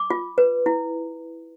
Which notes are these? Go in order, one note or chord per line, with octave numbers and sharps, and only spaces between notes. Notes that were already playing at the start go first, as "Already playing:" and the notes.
Already playing: D6
F4
B4
E4